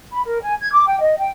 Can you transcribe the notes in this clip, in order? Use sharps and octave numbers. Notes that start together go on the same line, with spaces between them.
B5
A#4
G#5
G#6
D6
G5
D#5
G5